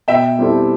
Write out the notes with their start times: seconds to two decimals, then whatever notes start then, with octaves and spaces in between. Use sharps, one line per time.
0.08 B2 E5 G5
0.39 G3 C4 E4 A4